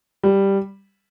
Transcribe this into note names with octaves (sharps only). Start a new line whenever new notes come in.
G3